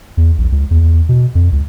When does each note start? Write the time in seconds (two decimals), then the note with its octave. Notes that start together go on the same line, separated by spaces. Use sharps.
0.17 E2
0.38 A#1
0.52 C#2
0.71 E2
1.09 B2
1.35 F2
1.52 C#2